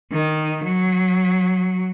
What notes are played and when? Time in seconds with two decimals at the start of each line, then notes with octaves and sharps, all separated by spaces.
0.12 D#3
0.65 F#3